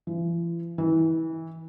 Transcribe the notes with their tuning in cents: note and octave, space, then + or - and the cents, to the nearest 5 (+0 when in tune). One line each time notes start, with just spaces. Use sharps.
E3 +45
E3 -25